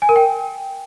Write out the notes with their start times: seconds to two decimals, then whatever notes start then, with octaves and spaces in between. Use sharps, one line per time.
0.02 G#5
0.09 A#4
0.16 G5